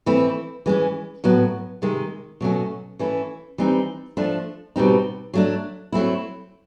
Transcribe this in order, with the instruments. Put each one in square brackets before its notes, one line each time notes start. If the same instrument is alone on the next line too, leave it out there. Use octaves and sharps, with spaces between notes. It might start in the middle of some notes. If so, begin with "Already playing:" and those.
[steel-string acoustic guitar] E3 A3 C4 E4
E3 G#3 C#4
A2 F#3 B3
C3 D#3 G#3
B2 F#3 A3 C#4
E3 A3 C#4 E4
E3 G3 C4 D#4
F3 A3 D4
B2 G3 C4 D#4
F#3 A3 D4
F#3 A3 C4 E4